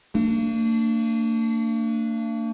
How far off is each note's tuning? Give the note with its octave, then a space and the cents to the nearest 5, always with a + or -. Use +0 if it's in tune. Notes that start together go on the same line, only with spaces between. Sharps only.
A#3 -45 D4 +0